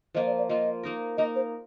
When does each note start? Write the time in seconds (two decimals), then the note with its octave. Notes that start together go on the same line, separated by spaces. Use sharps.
0.15 F3 A#3 F4 D#5
0.26 D5
0.38 D5
0.49 F3 A#3 F4 D#5
0.83 A#3 D#4 A#4
1.17 A#3 D#4 A#4 D#5
1.35 C5